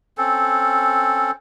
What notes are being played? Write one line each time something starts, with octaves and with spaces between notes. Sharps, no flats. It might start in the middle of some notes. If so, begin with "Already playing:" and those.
C4 C#4 A4